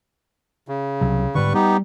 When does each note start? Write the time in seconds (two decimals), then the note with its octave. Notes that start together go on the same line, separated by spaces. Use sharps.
0.68 C#3
1.01 C2 C3 F#3
1.35 G#2 D3 G3 B4 C#6
1.54 G3 B3 D#4 G4